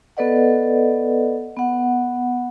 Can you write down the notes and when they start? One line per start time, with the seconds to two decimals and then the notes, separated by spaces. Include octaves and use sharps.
0.17 B3 A4 B4 D5 D#5 F#5
1.57 B3 F#5